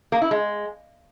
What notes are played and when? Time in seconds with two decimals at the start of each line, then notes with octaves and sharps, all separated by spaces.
0.12 A#3
0.22 E4
0.31 G#3